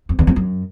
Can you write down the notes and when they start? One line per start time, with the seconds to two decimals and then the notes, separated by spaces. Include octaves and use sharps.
0.09 F2
0.19 E2
0.27 F2
0.36 F#2